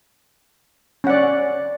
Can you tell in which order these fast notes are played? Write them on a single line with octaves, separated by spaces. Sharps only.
C#4 F#5 D5